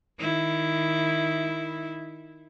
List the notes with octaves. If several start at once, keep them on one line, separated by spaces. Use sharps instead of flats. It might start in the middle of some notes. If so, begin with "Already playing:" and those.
D#3 E4